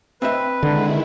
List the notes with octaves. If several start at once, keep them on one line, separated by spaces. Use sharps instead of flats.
C4 B4 D#5 E5
D3 D#3 G#3 E4